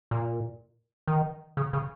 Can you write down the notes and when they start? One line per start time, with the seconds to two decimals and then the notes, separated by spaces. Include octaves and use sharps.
0.11 A#2
1.07 D#3
1.57 C#3
1.73 C#3